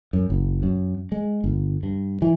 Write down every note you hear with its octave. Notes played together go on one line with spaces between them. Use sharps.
F#2
F#1
F#2
G#3
G1
G2
E3